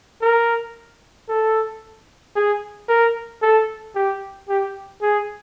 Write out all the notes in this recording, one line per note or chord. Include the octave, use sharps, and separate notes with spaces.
A#4
A4
G#4
A#4
A4
G4
G4
G#4